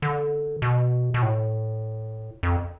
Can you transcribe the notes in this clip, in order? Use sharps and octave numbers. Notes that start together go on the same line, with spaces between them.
D3
B2
B2
A2
F2